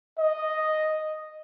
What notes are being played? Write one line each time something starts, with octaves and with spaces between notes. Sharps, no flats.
D#5